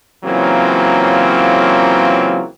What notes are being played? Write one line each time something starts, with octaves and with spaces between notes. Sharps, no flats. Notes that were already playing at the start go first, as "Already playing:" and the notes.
C#3 E3 F#3 A#3 C4 F4